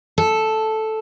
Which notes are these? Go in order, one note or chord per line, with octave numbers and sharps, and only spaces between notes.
A4